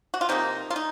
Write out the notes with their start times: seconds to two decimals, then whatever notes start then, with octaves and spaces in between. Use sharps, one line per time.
0.14 F#4
0.21 F4
0.29 C3 F3 A#3 D#4
0.70 F4
0.76 D#4